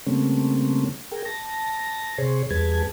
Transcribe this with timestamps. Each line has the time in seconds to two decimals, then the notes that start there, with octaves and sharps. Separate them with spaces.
0.07 C#3 G3 A3 A#3 C4 C#4
1.11 G#4 A#4 G5
1.25 A5 A#6
2.18 C3 G#4 C5 C#5
2.50 E2 G3 G#4 B4 A5 G#6